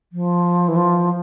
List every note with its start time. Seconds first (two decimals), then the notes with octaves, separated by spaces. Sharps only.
0.12 F3
0.68 E3
0.76 F3